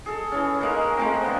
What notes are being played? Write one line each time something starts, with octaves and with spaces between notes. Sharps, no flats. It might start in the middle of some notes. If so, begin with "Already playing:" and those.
G#4 A4
E3 C#4
G#3 A#3 D#4 A#4
F3 G#3 A3 C4
D3 A#3 B3